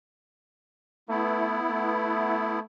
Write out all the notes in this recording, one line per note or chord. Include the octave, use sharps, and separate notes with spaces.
A3 B3 E4
A3